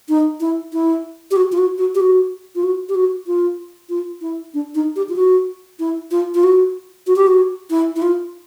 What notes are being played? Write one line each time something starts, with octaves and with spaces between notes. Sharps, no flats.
D#4
E4
E4
G4
F#4
F4
F#4
F#4
G4
F#4
F4
F#4
G4
F#4
F4
F4
E4
D4
D#4
G4
F4
F#4
E4
F4
F4
F#4
F#4
G4
F#4
E4
E4
F4